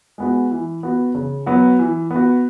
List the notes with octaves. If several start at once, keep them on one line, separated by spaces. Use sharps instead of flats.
G#3 B3 F#4
E3
B3 F#4
C#3
F#3 B3 F#4
E3
B3 F#4